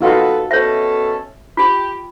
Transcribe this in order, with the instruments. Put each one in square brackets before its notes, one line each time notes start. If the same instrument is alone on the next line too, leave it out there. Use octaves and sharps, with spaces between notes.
[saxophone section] B3 A4 [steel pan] D#4 F4 F#4
[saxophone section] B2 C#4 A4 [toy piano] C#5 E5
[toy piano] F4 [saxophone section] G4